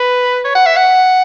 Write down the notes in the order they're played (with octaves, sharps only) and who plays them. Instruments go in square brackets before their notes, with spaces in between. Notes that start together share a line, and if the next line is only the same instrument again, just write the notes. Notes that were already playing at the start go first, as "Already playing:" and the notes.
Already playing: [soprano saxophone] B4
C#5
F#5
E5
F#5